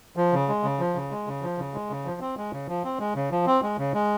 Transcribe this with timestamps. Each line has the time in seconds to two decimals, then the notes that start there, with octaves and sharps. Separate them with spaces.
0.17 F3
0.33 C#3
0.49 G#3
0.64 C#3
0.79 F3
0.95 C#3
1.11 G#3
1.27 C#3
1.42 F3
1.58 C#3
1.74 G#3
1.90 C#3
2.05 F3
2.21 C4
2.37 G#3
2.53 C#3
2.68 F3
2.84 C4
2.99 G#3
3.15 C#3
3.31 F3
3.46 C4
3.62 G#3
3.78 C#3
3.94 G#3